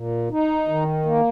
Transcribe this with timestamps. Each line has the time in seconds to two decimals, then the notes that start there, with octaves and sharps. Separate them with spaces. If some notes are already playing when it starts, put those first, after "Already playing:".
Already playing: A#2
0.31 D#4
0.68 D#3
1.05 A#3